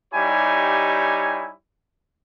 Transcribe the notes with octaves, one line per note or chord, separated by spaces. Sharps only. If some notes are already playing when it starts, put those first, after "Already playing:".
G3 D#4 E4 G4 C#5 G#5